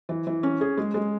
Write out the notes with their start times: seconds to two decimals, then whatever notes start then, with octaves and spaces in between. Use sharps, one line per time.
0.09 E3
0.27 E3
0.43 C#4
0.61 G#4
0.77 G#3
0.94 G#3